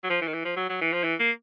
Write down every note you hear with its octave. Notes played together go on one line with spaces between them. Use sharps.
F#3
F3
E3
D#3
E3
F3
F#3
F#3
E3
F3
E3
A#3